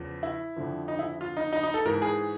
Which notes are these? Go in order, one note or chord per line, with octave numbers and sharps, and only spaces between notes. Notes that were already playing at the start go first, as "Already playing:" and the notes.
Already playing: E2 C#3 F3
E4
F2 D3 F3
D#4
E4
F4
D#4
D#4
D#4
A4
G#2 E3 A#4
G#4